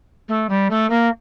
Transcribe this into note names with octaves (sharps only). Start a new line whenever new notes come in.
A3
G3
A3
A#3